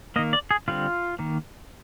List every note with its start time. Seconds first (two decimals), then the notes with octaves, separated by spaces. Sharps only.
0.16 D#3 A#3 D#5
0.33 D5
0.51 G#4
0.68 D3 G3 C4 F4
1.19 D#3 A#3